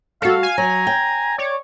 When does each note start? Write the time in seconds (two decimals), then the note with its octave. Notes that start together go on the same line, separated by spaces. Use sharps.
0.22 G3 F#4 A4 F5
0.43 G#5
0.58 F#3 A#5
0.87 G5
1.38 C#5 D5